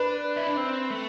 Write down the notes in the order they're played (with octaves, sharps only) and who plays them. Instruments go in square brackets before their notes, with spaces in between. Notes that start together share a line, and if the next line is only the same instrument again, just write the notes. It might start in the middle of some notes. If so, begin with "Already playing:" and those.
Already playing: [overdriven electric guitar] D4 [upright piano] B4
[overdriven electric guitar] E4
D4
C4
A3